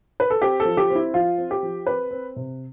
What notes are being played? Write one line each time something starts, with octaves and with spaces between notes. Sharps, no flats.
B4
A4
C4 G4
A4
F3
G4
C4
E4
F3 F4
C4
G4
F3
C4 B4
C4
C3